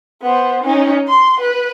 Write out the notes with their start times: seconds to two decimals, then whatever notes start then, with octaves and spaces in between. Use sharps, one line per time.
0.22 B3 C5
0.64 C#4 D#4
1.08 C6
1.40 B4